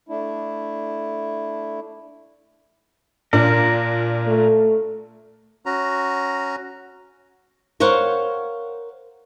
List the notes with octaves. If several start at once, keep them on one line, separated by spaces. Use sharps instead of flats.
A3 D4 E4
A#2 D4 A#4
A3
C#4 F#4 A#5
A#4 C5 C#5 F5 F#5